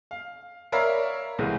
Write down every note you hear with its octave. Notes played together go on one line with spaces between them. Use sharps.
F5
A#4 C#5 D5 E5 F5 B5
C2 A2 E3 G#3